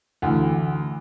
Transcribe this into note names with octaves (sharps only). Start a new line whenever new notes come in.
D2 E3